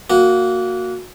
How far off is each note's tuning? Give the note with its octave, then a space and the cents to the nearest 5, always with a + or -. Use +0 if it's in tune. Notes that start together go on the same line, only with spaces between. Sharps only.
A#3 -15 F#4 -10